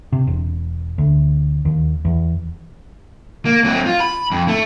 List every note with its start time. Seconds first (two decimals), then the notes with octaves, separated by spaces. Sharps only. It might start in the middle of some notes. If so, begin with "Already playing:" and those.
0.13 C3
0.27 E1
0.98 D2
1.65 D#2
2.05 E2
3.45 A#3
3.65 F#3 C4
3.86 F4
4.00 B5
4.32 F2
4.48 A3